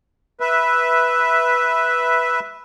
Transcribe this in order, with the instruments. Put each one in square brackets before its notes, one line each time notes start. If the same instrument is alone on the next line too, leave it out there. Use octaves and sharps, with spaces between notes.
[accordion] B4 E5